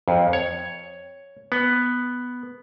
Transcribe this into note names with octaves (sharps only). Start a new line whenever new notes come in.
F2
C#5
B3